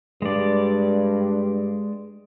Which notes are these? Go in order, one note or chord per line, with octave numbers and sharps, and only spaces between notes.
G2 G#3 D5